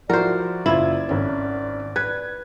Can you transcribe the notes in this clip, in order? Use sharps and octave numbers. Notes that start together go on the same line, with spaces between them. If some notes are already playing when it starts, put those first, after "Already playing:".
F3 E4 F#4 A#4 C5 D5
F#1 E4 F4 G#6
G#1 C#4
B4 G#6